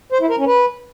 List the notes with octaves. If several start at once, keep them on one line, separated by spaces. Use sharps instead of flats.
C5
E4
A#4
C#4
B4